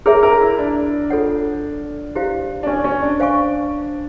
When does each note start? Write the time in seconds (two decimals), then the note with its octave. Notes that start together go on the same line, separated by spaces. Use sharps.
0.06 G#4 A#4 C#5 E5
0.23 A#4
0.40 E4
0.58 D4
1.10 F4 A4 C#5 F#5
2.15 E4 G4 C5 F5
2.63 D4
2.67 C#4
2.84 C#4
3.02 D4
3.20 C5 F5 G#5 C#6